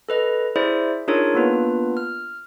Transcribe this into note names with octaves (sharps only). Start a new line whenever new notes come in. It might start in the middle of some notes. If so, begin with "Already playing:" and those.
A4 B4 D#5
E4 G#4 C5 D5 E5
D4 D#4 F4 G#4 A#4 C#5
A#3 B3 D4 F4 B4
F6